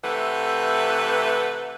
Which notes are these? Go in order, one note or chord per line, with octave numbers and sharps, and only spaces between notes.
C3 E3 A3 B4 F#5